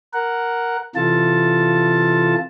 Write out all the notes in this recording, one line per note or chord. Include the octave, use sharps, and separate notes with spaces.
A#4 F#5
C3 E3 F4 A4 A5